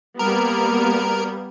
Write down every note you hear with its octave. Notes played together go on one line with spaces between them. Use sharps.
G3 A#3 B3 A#4